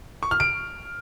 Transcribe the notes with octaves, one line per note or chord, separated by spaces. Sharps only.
C#6
F6
D7